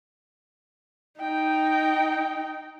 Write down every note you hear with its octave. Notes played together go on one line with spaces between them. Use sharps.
D#4 G5